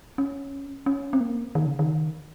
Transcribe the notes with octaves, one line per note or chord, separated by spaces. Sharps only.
C#4
C#4
C4
A#3
D#3
C#3
D#3